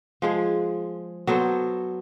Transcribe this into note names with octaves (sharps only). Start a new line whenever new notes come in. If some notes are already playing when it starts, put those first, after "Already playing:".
F3 G#3 G#4
F#3 B3 A4 C5